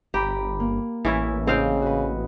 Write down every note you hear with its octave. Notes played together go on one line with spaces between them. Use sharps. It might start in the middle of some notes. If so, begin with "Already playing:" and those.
G1 G4 A#5 B5 D6
A#3
A1 E3 C#4 E4
C#3 C4 D#5 F5 G5
F#4 B4